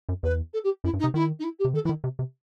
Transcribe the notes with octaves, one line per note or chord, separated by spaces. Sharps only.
F#2
E2 B4
A4
G4
F#2 E4
G2
D#4
C3
D#3 E4
D#4
E4
G4
C3
D#3 A4
E3 E4
D#3
C3
C3